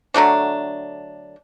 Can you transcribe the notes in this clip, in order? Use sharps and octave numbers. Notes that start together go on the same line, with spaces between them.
D3 F#3 A3 D4